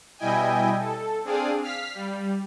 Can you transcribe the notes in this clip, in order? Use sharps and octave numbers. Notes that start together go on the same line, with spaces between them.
B2 G3 E4 D#5 G5 G#5
A4
C4 D4 G#4 D5 F5 D#6
F5 F6 B6
G3